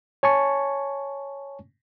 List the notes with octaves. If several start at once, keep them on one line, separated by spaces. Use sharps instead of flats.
C#5 G#5 A5 C#6